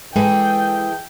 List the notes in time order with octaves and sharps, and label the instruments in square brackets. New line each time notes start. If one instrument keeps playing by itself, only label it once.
[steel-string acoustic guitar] E3 G#4 A4 [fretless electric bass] G#3 [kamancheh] G5